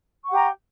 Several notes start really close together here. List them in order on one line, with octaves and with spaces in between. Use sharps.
C#6 F#5 G4 A#5